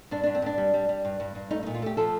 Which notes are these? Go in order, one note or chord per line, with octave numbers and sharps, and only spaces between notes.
G2 D4
G2 D4
C4
G2 D4
G3
G3
G3
G2
G2
G2
A3 D#4
A#2 D#4
F4
A3 G4
F3 A4